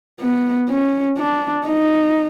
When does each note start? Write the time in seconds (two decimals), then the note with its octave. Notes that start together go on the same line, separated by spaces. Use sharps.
0.21 B3
0.70 C#4
1.18 D4
1.66 D#4